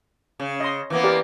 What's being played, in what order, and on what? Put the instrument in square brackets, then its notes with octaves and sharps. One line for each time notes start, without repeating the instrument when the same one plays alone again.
[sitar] C#3
[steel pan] D#5 C6
[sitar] E3 A#3 B3
[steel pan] G4 A#4 D5